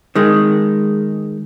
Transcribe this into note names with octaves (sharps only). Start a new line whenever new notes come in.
D#3 G#3